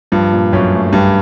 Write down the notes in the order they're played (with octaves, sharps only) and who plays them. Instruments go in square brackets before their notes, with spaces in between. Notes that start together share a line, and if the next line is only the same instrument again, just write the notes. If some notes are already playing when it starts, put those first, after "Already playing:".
[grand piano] G2 [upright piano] F3
[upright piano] A#2
[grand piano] F#2 [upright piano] C#4
[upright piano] A3
[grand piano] G2 [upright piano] G3